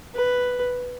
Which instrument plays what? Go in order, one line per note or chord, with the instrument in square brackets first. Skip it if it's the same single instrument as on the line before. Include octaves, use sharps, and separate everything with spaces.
[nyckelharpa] B4